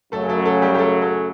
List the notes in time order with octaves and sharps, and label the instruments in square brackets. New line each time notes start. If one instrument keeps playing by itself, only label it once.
[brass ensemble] F#2 C#3 F#3 [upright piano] A3 A4
[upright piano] A3 A4
A3 A4
G3 G4
G4
A3 A4
A3 A4